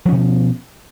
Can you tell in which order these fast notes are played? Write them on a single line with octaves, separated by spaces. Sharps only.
F3 C#4 B2